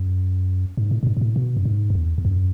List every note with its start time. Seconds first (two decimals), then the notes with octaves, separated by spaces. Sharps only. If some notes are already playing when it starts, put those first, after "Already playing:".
Already playing: F#2
0.77 G#2
0.91 A2
1.03 A2
1.07 G#2
1.17 G#2
1.21 A2
1.36 B2
1.57 F#2
1.65 G#2
1.90 F#2
1.95 E2
2.18 E2
2.25 F#2